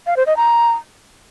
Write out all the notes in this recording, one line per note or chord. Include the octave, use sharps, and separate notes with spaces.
F5
C5
D#5
A#5